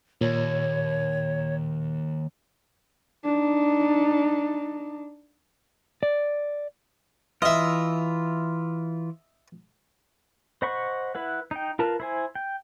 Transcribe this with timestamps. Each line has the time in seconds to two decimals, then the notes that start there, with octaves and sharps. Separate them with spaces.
0.21 D#2 A#2 C#5
3.25 D4 D#4
6.03 D5
7.42 E3 F4 D#5 E5
10.62 C5 D#5 F#5 B5 C#6
11.15 E4 B4 F#5
11.51 D#4 G5
11.79 F4 A#4 B4 A5
12.00 E4 C5 G#5
12.35 G5